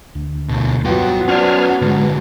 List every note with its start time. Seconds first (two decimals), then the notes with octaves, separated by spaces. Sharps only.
0.15 D2
0.49 B2 A3
0.85 G2 F#3 B3 F4 G5
1.28 C#4 C5 D5 G#5 F6
1.82 G#2 D3 G#3